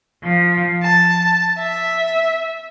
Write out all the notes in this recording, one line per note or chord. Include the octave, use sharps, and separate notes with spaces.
F3
A5
E5